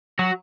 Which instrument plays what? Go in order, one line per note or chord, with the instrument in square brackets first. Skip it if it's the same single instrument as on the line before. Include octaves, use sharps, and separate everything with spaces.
[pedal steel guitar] F#3 [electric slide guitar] F#4